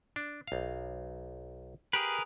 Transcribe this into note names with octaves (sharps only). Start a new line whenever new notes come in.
D4
B1 F5
G4 G#4 A#4 B4